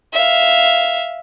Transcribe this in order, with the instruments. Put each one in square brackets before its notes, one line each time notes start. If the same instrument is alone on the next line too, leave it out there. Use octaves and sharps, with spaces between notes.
[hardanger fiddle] E5 F5